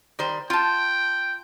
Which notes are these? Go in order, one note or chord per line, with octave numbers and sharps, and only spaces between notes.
D#3 G3 C5
F4 G5 A5